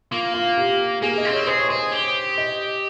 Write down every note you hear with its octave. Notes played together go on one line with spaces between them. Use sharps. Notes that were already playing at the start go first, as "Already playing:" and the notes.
A#3 F4
F4
G4
A#3 G#4
D#5
C4
C#5
G#4 C5
C#5
G#4 C5
G4
D#5